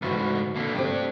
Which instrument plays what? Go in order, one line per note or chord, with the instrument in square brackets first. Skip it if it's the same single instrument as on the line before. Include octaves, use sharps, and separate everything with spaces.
[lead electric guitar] D2 G#2 [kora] E3 F#4 B4
[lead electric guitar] A#2 D3
[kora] C3 A3 [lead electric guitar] D4 G4